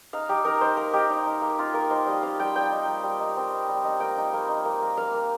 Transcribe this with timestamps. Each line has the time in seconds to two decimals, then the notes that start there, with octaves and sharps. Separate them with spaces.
0.13 D#4 F5
0.29 D#4 G4
0.45 D#4 A#4
0.61 D#4 C5
0.77 A#3 A#4
0.93 D#4 G4
1.10 D#4
1.26 D#4
1.41 A#3
1.59 D#4 F4
1.74 A#3 A#4
1.90 D#4 C5
2.06 G3 D#5
2.23 C4 F5
2.39 G3 G5
2.55 G3 G5
2.72 D#4
2.87 G3
3.03 G3
3.20 D#4
3.36 C4
3.52 D#4
3.68 G3
3.84 D#4
4.00 A#3 G5
4.17 D#4
4.33 A#3
4.49 D#4
4.65 A#3
4.82 A#3
4.97 A#3 F5
5.14 A#3